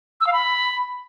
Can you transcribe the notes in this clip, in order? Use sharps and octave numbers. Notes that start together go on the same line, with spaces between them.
E6
F5
B5